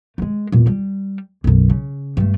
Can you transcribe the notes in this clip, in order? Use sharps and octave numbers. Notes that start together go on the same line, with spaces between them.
G#3 A3
E2 A#2
G3
B1 F#2
C#3
G2 A3